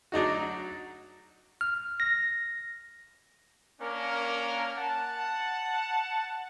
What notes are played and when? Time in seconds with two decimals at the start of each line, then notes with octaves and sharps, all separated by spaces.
0.12 F#3 D4 D#4 F#4
1.61 F6
2.00 A#6
3.81 A#3 C#4 D4 A#4
4.78 F#5 A5